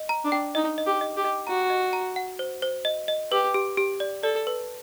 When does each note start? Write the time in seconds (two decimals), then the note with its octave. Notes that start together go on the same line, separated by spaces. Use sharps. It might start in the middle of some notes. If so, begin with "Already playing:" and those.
Already playing: D#5
0.09 A#5
0.24 D4
0.32 G5
0.55 D#4 D#5
0.78 D#5
0.86 G4
1.01 D#5
1.16 G4
1.24 D#5
1.47 F#4 A#5
1.70 D#5
1.93 A#5
2.16 F#5
2.39 C5
2.62 C5
2.85 D#5
3.08 D#5
3.32 G4 B4
3.54 G4
3.77 G4
4.00 D5
4.23 A4 D5
4.47 B4